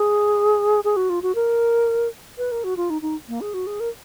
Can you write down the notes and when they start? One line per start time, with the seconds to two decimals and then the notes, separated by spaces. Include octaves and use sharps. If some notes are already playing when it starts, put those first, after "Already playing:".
Already playing: G#4
0.84 G#4
0.96 F#4
1.10 F4
1.22 F#4
1.35 A#4
2.38 B4
2.52 A#4
2.64 F#4
2.77 F4
2.90 D#4
3.02 D#4
3.28 A#3
3.41 G#4
3.54 F#4
3.67 G#4
3.80 A#4